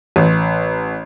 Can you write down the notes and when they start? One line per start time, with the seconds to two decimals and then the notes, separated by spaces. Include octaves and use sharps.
0.16 A1